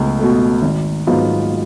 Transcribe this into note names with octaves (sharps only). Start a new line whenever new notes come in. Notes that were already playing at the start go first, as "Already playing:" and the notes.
Already playing: C#2 B2 A3
B2 A3
G#1
G#2 F#3 B3 F4